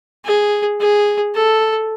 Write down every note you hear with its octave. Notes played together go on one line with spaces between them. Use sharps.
G#4
G#4
A4